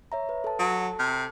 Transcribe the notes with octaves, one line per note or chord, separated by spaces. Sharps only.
C#5 E5 A#5
B4
A4 A5
F#3
C3